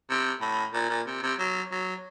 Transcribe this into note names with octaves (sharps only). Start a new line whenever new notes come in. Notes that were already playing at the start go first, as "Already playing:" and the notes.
C3
A2
A#2
A#2
C3
C3
F#3
F#3